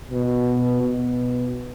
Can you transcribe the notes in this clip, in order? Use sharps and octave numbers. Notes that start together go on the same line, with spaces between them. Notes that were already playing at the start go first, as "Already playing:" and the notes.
B2
B2